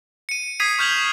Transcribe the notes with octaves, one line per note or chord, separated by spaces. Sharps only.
C#7 D#7
D#6 G#6 B6 C7 D#7
C#6 F6 G6 G#6 F7 F#7